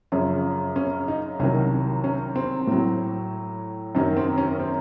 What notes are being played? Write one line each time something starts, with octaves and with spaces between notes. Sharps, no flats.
F#2 C#3 F3 C#4
C#4
D#4
C2 C3 D#3 F#3 C#4
C#4
C4
A2 F#3
F#2 D#3 F#3 C#4
C4
C#4
C4